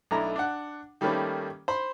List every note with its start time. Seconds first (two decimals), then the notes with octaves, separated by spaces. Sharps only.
0.11 B1 A3 D4 E4 A#5
0.36 D4 F#5
1.01 D#3 G3 A3 A#3 C#4 B4
1.68 C5 B5 C6